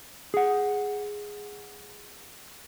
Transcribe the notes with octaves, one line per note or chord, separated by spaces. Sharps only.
G#4 F#5